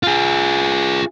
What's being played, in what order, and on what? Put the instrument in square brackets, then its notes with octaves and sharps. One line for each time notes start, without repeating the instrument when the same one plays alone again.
[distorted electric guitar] F4 G#4